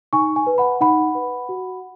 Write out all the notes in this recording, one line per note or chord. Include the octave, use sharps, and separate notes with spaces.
D#4 G#5 C#6
G#5
B4
F#5 B5
D#4 F#5 B5
B4
F#4